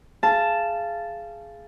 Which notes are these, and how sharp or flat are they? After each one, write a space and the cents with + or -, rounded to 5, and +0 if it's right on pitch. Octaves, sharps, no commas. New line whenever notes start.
G#4 +10 F5 -20 A5 +0